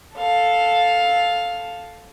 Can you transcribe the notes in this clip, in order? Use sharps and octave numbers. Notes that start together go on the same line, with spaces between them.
A4 F5